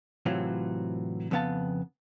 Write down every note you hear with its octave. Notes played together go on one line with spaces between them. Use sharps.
A2 C3 E3 F#3 C4 F4
F2 C#3 B3 F5 A5